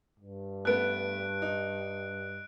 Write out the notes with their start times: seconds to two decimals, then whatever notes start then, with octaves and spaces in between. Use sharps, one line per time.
0.20 G2
0.65 A3 B3 F#6 D7
1.42 D#4